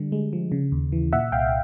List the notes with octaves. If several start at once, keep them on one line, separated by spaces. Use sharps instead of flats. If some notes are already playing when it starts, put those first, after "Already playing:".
Already playing: D3 G3
G#3
F3
C#3
D#2
E3
A#2 E5 F#5
C2 F5 G5